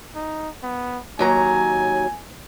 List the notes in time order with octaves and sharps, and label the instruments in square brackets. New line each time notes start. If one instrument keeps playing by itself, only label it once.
[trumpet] D#4
B3
[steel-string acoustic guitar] D#2 F#3 A#5 [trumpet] G#5